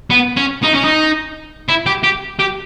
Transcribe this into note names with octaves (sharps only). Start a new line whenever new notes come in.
B3
C#4
D#4
C#4
D#4
E4
G4
G4
G4